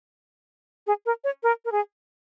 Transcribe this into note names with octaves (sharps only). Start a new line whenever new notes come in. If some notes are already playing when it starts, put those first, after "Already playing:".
G#4
A#4
C#5
A#4
A#4
G#4